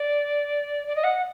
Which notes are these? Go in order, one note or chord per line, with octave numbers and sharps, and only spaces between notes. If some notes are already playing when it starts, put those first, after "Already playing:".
Already playing: D5
D5
D#5
F#5